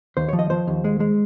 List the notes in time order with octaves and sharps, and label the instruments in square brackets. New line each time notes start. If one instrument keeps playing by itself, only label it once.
[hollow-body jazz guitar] D#2 C5
F3 C#5
D#5
F3 C5
D#2
G#3
G#3